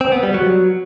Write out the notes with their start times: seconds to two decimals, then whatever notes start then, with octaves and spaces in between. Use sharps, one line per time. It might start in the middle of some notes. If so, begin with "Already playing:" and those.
0.01 C4
0.12 B3
0.23 G3
0.34 F#3